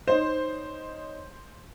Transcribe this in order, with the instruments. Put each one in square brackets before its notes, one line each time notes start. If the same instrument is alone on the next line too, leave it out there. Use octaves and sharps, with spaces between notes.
[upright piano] D#4 C#5 D#5 [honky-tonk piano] C5